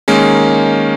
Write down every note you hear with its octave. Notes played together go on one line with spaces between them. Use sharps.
D#3 G#3 A#3 C#4